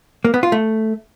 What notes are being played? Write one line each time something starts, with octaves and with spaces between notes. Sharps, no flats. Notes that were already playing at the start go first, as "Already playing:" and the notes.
A#3
B3
F4
A3